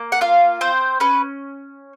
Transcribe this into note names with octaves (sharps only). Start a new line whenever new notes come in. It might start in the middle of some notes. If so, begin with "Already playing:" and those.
Already playing: A#3
F#5
F4 F5
C4 C5
C#4 B4